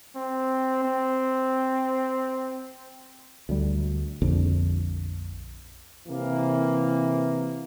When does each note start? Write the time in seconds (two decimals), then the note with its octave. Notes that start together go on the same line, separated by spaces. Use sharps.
0.16 C4
0.84 C4
3.49 D2 G3
4.22 A#1 F2 D3
6.08 C3 E3 A#3